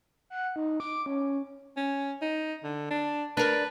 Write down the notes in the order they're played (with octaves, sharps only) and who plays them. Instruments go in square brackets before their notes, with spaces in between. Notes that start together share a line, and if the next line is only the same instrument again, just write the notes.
[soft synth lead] F#5
D#4
D6
C#4
[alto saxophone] C#4
D#4
D3
D4
[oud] D4 A#4 [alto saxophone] B4